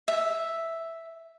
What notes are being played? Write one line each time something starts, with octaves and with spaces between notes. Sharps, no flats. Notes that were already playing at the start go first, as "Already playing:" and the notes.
E5